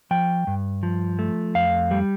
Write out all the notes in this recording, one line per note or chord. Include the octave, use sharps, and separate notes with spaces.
F3 G5
G2
F3
A3
F2 F5
G3